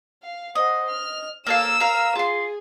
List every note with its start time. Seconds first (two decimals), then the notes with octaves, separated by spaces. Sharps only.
0.23 F5
0.55 C5 D#5 F#5
0.90 F6
1.47 A#3 A4 F5 E6 E7
1.80 A#4 F5
2.16 F4 G#4 C6